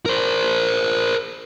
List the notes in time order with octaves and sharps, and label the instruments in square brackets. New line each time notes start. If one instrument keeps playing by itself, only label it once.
[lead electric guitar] A#4 C5